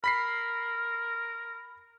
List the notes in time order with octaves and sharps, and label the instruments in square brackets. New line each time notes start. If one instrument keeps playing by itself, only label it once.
[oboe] A#4 [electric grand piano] B5 B6 C7